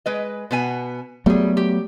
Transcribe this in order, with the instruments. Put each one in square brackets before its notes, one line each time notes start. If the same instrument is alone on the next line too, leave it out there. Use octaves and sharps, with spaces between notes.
[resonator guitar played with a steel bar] G#3 B4 D#5
B2 B3 G#5
[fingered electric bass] F#3 A3 B3 [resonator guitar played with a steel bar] G3 G#4
[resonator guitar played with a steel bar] G4